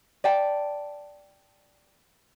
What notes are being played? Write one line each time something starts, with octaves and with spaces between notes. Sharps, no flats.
D5 G5 A5